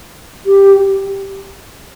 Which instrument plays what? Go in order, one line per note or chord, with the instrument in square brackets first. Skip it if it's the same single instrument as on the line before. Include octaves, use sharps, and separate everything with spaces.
[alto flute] G4